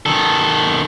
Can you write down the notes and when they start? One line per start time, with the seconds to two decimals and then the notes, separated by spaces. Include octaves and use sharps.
0.06 D#3 A4